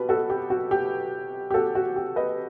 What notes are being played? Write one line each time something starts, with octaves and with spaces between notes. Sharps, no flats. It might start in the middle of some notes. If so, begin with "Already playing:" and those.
Already playing: B2 G4 B4
F#4 A4
G4
F#4
G4
G4
F#4 A4
F#4
G4
B4 D#5